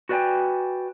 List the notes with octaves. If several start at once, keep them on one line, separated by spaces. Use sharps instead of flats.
F#4 B4 D5 E5 G5 G#5